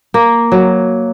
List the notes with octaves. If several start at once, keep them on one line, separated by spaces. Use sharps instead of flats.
A#3
F#3